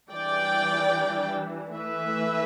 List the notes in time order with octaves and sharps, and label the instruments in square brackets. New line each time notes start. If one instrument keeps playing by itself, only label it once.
[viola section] E3 G3 D4 D5 G5
E3 A3 E4 B4 E5